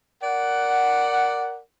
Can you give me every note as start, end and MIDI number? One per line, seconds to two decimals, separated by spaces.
0.23 1.59 70
0.23 1.59 74
0.23 1.59 78